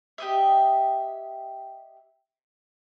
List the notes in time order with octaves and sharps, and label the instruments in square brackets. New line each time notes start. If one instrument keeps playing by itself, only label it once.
[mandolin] G4 D#5 E5